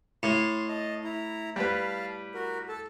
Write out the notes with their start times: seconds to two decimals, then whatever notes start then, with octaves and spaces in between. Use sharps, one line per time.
0.23 A2 C6
0.68 D#5 A5
1.04 E4 A#5
1.56 G3 B4 F5 A5
2.34 F#4 A#4
2.69 A4 A5